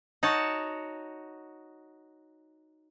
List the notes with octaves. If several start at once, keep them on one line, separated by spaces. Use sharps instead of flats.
D#4 F#4 C#5 A5